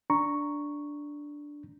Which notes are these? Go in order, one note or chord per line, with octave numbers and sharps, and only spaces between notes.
D4 A#5 C#6